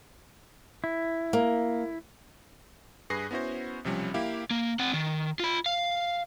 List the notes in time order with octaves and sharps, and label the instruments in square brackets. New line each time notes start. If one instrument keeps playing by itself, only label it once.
[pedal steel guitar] E4
[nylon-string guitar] A#3
[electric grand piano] G2 G#4 B4 A#6 C7
B3 C#4 E4 F#4 C5
B1 C3 F3 G3 C#4
A#3 E4 G4 F5
[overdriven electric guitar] A#3
C4 F#5
D#3
F4 B5
F5